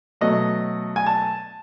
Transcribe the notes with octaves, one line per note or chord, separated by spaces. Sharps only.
B2 F#3 A3 D#5
G#5
A5